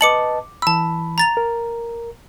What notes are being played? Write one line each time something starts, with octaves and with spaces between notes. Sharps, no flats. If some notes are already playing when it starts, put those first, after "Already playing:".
B4 D#5 A5 D6 C#7 F#7
E3 A5 B5 E6
A#5 A6 F7
A#4